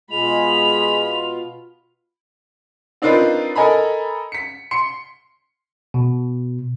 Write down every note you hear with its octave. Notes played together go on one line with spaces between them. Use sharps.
B2 G#3 F4 B5 F7
C4 D4 D#4 F4 A#4 B4
A4 A#4 D#5 G#5 A#5 B5
B6 C#7
C6 C#7
B2